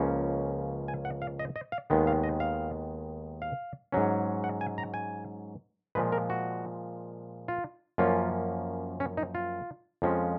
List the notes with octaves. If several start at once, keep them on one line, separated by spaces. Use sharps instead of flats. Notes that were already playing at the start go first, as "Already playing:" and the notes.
Already playing: C#2 C#3 F3 A#3 C#4
G#5
F#5
F5
D#5
D#5
F5
D#2 D#3 G#3 B3
F5
D#5
F5
F5
G#2 F#3 C#4
F#5
G#5
A#5
G#5
A#2 F3 G#3 B4
A#4
F#4
F4
F#2 F3 A#3 C#4 F4
C#4
D#4
F4
F2 F3 G#3 C#4